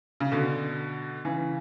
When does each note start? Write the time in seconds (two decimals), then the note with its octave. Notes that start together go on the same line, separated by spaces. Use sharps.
0.20 C#3
0.32 B2 D3
1.25 C#3 E3